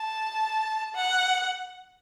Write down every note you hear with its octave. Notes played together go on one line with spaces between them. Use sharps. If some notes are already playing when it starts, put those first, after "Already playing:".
Already playing: A5
F#5